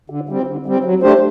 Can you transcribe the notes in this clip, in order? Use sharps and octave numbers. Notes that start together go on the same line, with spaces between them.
D3
G3 C4
D3
G3 C4
F#3
A3 D4 G4 C5